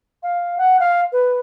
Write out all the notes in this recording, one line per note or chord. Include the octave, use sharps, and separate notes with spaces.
F5
F#5
F5
B4